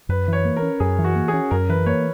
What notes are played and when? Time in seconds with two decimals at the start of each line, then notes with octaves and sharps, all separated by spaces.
0.09 F#2 B4
0.28 E3 C#5
0.45 A#3
0.57 A#4
0.62 C#4
0.80 F#2 G#4
0.99 E3
1.04 F#4
1.16 A#3
1.28 G#4
1.33 C#4
1.51 F#2 A#4
1.69 E3 B4
1.86 A#3 C#5